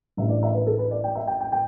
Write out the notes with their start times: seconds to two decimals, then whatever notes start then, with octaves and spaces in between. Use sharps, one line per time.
0.17 A1 A2 A3 D4 E5
0.30 D5
0.43 E5
0.54 B4
0.67 A4
0.78 B4
0.91 D5
1.04 G5
1.15 E5
1.27 G5
1.40 G5
1.52 G5